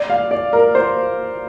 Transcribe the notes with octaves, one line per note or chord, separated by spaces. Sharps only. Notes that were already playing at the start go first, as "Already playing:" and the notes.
Already playing: D5
F5
D5
A#4
C5